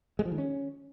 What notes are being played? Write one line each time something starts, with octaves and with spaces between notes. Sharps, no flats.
G#3
F3
D#3
C#4